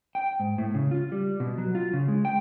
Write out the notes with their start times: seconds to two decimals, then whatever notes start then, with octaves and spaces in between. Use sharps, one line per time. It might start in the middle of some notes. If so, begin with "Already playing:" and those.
0.15 G5
0.40 G#2
0.58 A2
0.75 C#3
0.91 F4
1.12 G3
1.40 B2
1.58 F#3
1.75 F4
1.93 C#3
2.08 G#3
2.25 G5